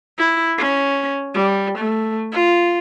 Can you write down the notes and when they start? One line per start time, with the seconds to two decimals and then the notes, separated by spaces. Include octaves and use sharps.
0.18 E4
0.58 C#4
1.35 G3
1.78 A3
2.32 F4